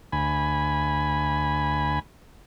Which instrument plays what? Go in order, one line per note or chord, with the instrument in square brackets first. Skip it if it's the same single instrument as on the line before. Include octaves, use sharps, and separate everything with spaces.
[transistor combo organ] D2 G#5 B5